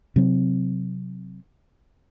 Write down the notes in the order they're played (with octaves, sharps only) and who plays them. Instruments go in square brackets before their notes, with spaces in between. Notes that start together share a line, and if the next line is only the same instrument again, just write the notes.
[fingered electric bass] C3 F#3 C4